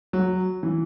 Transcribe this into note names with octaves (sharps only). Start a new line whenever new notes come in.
F#3
E3